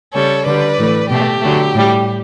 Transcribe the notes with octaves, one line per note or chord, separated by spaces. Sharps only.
C#3 G3 A4 C#5
D3 G3 B4 D5
A2 E3 A3
B2 A3 G4
D3 F#3 A3
A2 G3